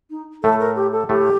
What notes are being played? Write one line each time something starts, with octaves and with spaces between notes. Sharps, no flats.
D#4
A2 A3 A4
A#4
G4
A4
A2 A3 G4